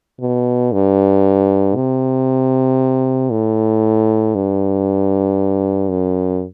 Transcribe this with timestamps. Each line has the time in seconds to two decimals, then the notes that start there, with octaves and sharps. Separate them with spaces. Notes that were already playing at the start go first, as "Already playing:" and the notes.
0.21 B2
0.72 G2
1.76 C3
3.31 A2
4.35 G2
5.90 F#2